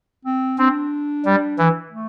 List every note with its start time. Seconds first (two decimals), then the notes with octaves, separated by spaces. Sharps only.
0.25 C4
0.58 C4 D4
1.25 G3
1.58 E3
1.92 A3